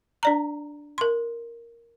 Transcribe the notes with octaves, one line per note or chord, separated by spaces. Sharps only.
D4 D5 A#5
A#4 C6